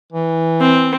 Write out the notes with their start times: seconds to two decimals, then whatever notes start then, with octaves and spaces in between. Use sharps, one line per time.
0.13 E3
0.60 C4